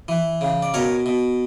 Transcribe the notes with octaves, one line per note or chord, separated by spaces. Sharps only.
E3
C#3
D5
B2 A#4 C#5
B2